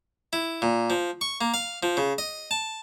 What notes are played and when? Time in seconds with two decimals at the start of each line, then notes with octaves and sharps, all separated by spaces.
0.33 E4
0.62 A#2
0.90 F3
1.21 C#6
1.41 A#3
1.54 F5
1.83 F3
1.97 C#3
2.18 D#5
2.51 A5